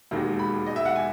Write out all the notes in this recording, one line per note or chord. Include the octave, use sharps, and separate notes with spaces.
E1 D#2 D#3 G#3
B5
D#5
E5
F#5
G#5